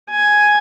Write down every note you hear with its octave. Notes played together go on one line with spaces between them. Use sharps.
G#5